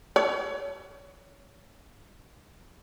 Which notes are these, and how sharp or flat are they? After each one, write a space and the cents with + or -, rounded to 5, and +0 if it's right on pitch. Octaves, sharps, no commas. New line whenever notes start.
C#5 +20